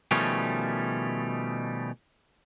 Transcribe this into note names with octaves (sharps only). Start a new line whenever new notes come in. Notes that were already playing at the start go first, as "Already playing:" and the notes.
B2 D#3 F3 G3 A3 C#4